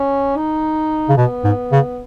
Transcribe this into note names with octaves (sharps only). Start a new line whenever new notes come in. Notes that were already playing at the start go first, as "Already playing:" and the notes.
Already playing: C#4
D#4
C#3
B2 B3
G#2
C#3